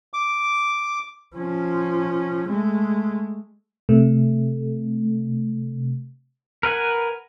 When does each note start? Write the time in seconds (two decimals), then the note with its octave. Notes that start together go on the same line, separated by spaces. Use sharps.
0.14 D6
1.36 F3 C#4
2.48 G#3 A3
3.89 C3 A3
6.63 A#4 B4 F#5 G#5